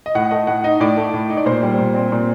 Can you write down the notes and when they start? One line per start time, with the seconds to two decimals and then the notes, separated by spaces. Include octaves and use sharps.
0.06 D#5
0.15 A2 F#5
0.31 A3 D#5
0.47 A2 F#5
0.64 D#4 D#5
0.80 A2 D5
0.97 A3
1.14 A2
1.30 D#4
1.37 D5
1.46 A#2 C5
1.63 G3
1.79 A#2
1.94 C4
2.12 A#2